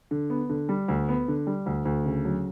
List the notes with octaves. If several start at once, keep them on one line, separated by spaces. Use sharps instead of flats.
D3
B3
D3
G3
D2
B3
D3
G3
D2
D2
C#3
F#3